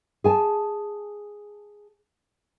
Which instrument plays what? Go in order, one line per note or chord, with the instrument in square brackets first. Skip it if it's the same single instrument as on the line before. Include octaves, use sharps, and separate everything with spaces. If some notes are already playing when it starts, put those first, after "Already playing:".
[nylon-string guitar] G#4 G#5 A5